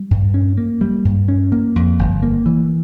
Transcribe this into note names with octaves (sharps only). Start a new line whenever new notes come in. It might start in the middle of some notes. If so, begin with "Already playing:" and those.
Already playing: G3
G2
C#4
A#3
G3
G2
C#4
A#3
F2
G1
A#3
E3